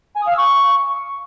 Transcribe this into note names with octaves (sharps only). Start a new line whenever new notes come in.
G#5
D#6
F5
E6
C#6